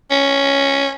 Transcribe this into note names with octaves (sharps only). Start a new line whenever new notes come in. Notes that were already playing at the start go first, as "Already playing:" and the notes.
C#4